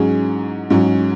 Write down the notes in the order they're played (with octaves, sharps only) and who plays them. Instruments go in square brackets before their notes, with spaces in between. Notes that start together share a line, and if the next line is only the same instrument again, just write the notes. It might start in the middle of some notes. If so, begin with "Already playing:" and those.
Already playing: [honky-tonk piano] G#2 F#3 C#4 G#4
G#2 F#3 C#4